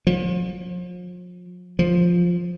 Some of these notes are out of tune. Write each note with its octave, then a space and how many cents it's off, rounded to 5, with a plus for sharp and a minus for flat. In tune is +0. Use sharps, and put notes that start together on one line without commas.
F3 +40
F3 +5